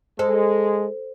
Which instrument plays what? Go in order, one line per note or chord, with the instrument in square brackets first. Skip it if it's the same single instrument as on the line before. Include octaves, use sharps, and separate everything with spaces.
[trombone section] G#3 [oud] A4 [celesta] C5